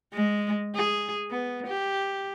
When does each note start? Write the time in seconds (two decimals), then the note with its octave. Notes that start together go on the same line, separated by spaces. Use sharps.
0.14 G#3
0.76 G#4
1.31 B3
1.67 G4